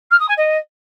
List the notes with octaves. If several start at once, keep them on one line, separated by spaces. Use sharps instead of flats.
F6
D#6
G#5
D#5